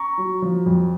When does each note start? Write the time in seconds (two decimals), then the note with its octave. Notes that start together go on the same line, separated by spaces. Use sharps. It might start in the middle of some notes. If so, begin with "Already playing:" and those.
Already playing: A#5 C#6
0.18 F#3
0.42 F3
0.66 F2